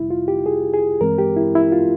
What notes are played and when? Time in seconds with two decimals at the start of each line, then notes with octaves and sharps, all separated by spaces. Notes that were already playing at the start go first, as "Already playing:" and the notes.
Already playing: F2 C3 G3 E4
0.10 F4
0.28 G4
0.46 G#4
0.74 G#4
1.00 G2 E3 G#3 C4 A#4
1.18 G4
1.36 E4
1.55 E4
1.72 F4